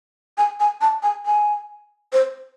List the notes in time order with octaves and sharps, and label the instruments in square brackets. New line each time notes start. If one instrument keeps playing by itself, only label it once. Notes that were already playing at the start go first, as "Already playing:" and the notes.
[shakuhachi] G#5
G#5
A5
G#5
G#5
C5